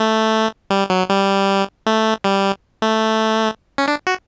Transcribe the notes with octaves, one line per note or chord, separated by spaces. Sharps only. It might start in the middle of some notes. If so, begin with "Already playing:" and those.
Already playing: A3
G3
F#3
G3
A3
G3
A3
C#4
D4
F#4